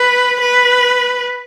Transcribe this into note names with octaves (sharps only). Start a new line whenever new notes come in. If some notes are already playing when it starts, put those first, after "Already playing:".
Already playing: B4
B4